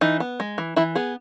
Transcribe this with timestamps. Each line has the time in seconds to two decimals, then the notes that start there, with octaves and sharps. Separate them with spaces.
0.01 E3 D#4
0.20 B3
0.40 G#3
0.58 E3
0.76 E3 E4
0.95 B3 G#4